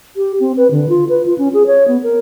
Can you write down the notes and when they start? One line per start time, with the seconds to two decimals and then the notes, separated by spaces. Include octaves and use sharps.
0.16 G4
0.40 C4
0.57 B4
0.71 D3
0.89 F4
1.09 B4
1.26 F4
1.38 C#4
1.54 G#4
1.67 C#5
1.88 B3
2.03 A#4